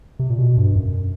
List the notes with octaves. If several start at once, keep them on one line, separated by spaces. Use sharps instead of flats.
C3
A#2
B2
G2
F#2